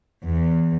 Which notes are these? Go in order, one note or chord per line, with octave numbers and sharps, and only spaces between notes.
E2